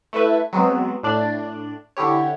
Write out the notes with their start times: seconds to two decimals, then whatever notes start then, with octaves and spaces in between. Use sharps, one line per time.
0.13 A3 E4 A4 B4 E5
0.53 F#3 G#3 B3 C4
1.03 A2 D4 D5
1.97 D3 E4 G4 C#5